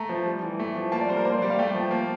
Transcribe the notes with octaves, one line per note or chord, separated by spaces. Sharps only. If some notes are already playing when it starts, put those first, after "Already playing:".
Already playing: A3 A#5
F3
G3
E3
A3
F3
A#3 A5
D5
G3 C5
A#4
A#3 C5
D5
G3
F5
A3 G5
F3
A#3